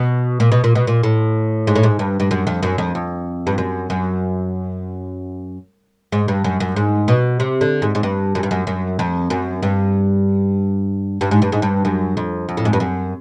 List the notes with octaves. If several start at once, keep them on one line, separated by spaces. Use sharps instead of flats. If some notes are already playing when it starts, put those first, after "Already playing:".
Already playing: B2
A#2
B2
A#2
B2
A#2
A2
G#2
A2
G#2
G2
G2
F#2
F2
F#2
F2
F2
G2
F#2
F#2
G#2
G2
F#2
F#2
G#2
B2
C3
D3
G#2
G#2
G2
F#2
G2
F#2
F#2
F2
F#2
G2
G2
G#2
G2
G#2
G2
F#2
F2
F2
A2
G#2
G2
F#2